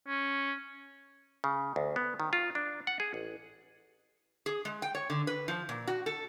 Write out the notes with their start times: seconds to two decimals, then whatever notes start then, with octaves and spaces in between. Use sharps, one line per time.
0.08 C#4
1.44 C#3
1.76 D2
1.96 B3
2.20 D#3
2.33 F4
2.55 D4
2.87 F#5
3.00 G#4
3.14 A1
4.46 G#4
4.65 G#3
4.82 G5
4.95 C#5
5.10 D3
5.27 B4
5.48 F3
5.69 A#2
5.87 F#4
6.06 A4